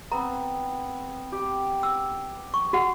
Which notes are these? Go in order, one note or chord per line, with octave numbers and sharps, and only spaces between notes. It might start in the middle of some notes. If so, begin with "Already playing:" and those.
B3 C4 A#5
G4
E6
C#6
F#4 F#5